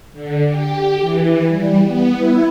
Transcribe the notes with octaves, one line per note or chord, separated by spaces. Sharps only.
D3
G4
E3
G3
B3
E4